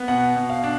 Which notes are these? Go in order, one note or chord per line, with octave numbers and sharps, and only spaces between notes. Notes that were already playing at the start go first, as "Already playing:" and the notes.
Already playing: B3
B2 F#5
B2
F5
D4